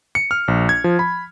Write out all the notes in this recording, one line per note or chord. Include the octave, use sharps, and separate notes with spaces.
C#7
F6
A#1
G#6
F3
B5